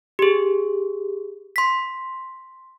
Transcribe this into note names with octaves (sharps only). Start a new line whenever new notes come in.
G4 G#4
C6 B6